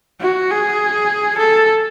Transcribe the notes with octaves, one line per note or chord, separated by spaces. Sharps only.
F#4
G#4
A4